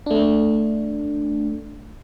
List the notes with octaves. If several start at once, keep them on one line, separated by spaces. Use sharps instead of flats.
A3 D4